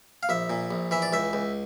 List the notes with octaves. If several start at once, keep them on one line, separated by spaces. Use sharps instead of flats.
F5
A#1 E5
A#2
A#1
E3 E5
D5
C#2 E5
C#2